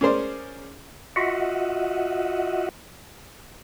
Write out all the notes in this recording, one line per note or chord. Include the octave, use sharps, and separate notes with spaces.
C#4 G#4 A#4 C5 D5
F4 F#4 D#5 E5 F#5